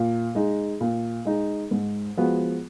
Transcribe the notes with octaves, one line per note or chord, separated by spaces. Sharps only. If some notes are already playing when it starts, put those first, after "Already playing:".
Already playing: A#2
G#3 D#4
A#2
G#3 D#4
G#2
F3 G#3 B3 F#4